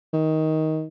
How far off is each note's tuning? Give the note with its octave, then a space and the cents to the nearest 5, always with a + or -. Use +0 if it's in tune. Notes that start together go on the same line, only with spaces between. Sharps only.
D#3 +15